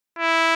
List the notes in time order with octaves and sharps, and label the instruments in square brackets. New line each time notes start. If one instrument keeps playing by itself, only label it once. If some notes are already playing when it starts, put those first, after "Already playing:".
[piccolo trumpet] E4